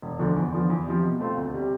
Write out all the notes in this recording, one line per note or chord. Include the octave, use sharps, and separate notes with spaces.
E1
D2 D3 F3
E2
D3 F3 B3
E2
C3 F3
B2
A3 C4 F4
D2
C3 G3